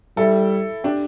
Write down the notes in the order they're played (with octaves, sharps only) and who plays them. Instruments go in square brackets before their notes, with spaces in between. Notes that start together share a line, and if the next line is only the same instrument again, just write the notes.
[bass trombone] G3 [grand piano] E4 A4
[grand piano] D4 G4